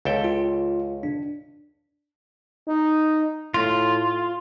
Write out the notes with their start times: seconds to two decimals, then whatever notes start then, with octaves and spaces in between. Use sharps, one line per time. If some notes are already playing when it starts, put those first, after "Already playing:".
0.05 C#2 A4 G5
0.24 F4
1.03 D4
2.67 D#4
3.54 A2 F4